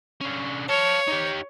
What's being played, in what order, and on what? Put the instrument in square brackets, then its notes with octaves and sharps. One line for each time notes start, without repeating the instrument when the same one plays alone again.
[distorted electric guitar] D3 C#4
[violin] C#5 [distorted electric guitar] F5 A5
[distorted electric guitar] D#4 G4